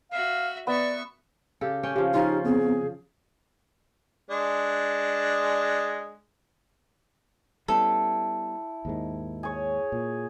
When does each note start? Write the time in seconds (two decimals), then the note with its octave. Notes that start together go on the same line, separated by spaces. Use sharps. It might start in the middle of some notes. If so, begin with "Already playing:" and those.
0.12 F#4 E5 F5
0.67 B3 D5 E5 C#6
1.61 C#3 G4 A4
1.83 C#4 G5
1.96 C#3 F3 G4
2.14 F3 C#4 D#4 F4
2.44 B3 C4 G#4
4.30 G#3 D4
7.68 G3 B3 C#4 E4 A4
8.85 D#2 G#2 D#3
9.43 G#4 C#5
9.92 A#2